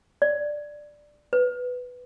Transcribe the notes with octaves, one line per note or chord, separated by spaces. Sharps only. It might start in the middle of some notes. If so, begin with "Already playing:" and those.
D5
B4